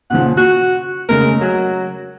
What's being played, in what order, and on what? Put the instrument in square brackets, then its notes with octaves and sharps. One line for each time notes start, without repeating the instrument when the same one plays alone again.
[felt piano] A#2 C#3 F3 [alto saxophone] F#5
[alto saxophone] F#4 [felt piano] F#6
[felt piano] C#3 G#3 A3 [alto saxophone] A#4
[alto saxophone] F#3 [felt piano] F#4